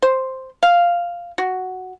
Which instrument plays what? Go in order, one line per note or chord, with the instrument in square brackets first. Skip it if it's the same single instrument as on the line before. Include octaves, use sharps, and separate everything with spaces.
[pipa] C5
F5
F#4